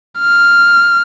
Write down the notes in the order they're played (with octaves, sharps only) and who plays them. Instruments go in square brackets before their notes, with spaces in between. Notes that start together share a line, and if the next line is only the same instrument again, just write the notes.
[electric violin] F6